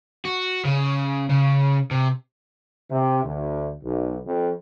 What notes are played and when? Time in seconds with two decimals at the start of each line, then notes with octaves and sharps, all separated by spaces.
0.25 F#4
0.65 C#3
1.29 C#3
1.91 C3
2.91 C3
3.24 D2
3.83 B1
4.27 F2